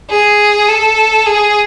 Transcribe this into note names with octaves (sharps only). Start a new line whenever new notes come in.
G#4
A4
G#4